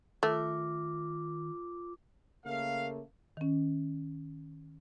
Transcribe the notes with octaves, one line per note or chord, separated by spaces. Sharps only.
D#3 A3 F4 A#4 D6
C#3 A3 A#3 F5
D#3 C#4